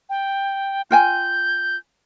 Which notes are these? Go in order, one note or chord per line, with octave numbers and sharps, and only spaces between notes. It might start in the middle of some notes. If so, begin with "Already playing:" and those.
G5
F4 G5 G#5 G6